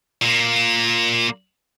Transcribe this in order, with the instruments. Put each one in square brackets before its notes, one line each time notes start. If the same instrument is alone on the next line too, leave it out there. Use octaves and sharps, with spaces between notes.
[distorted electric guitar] A#2 A#3